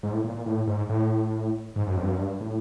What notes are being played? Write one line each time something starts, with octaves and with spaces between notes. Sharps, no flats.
G#2
A2
A#2
A#2
A2
G#2
A2
G#2
F#2
F2
G2
F#2
G2
A2